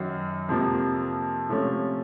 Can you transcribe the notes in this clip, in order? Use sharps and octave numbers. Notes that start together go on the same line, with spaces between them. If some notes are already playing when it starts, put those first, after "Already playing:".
Already playing: F#2 D#3 F#3
F2 C3 F3 A#3
C3 F3 A3 C#4